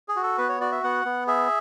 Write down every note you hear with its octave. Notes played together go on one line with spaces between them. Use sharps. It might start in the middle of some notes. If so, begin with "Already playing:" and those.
G#4
F#4
A4
B3 B4
C#5
F#4 D5
E5
B3 F#5
B3
G#4 E5